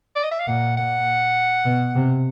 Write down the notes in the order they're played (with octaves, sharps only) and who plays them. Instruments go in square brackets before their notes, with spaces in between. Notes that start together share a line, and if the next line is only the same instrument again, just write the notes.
[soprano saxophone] D5
D#5
E5
F5
[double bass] A#2 [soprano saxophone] F#5
[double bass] A#2 [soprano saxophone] F#5
[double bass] B2
C3